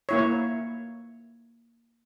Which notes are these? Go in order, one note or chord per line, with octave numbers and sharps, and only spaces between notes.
A#3 E4 C#5